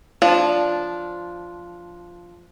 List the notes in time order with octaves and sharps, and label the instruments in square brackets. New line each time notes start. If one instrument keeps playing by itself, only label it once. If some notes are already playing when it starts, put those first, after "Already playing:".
[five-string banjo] F3 D4